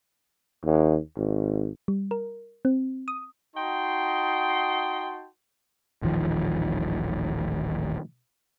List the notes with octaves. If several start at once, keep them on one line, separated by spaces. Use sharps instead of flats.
D#2
G#1
G3
A#4
C4
D#6
D#4 F#4 D#5 G5 A5 C6
D#1 A1 D#3 F3